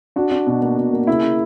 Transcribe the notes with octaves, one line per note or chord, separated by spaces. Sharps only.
D4 F#4
D4
B2
A#3
B2
A#3
C#3 E4
C#3